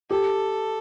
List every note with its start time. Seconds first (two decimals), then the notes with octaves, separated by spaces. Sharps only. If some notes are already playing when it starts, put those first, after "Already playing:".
0.11 G4 A4